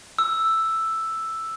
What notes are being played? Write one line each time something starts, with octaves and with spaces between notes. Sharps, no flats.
E6